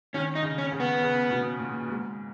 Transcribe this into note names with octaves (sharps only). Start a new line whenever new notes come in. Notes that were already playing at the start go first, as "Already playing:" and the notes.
D#3 C#4
D#4
C#3
C#4
C#3
B3
C#3
B2
A#2
G#2